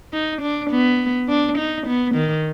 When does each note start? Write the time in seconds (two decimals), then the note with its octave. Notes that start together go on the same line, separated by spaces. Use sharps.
0.13 D#4
0.42 D4
0.71 B3
1.29 D4
1.58 D#4
1.87 B3
2.15 D#3